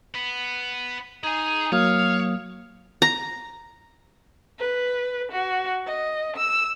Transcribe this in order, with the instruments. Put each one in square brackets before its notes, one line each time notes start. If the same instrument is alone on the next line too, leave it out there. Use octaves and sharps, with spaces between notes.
[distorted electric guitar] B3
[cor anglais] D#4 [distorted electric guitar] G#4 G#5
[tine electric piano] F#3 A#3 D#6 [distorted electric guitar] C#5 [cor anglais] F5
[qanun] A#5
[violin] B4
F#4
D#5
E6